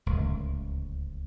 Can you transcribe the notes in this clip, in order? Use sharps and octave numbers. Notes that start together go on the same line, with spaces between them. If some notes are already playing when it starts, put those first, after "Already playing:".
D1 C#2